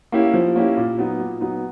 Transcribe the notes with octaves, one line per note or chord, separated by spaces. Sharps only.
A#3 C#4 E4 G4
F3
A#3 C#4 E4 G4
A#2
F#3 B3 D#4
A#2
F#3 B3 D#4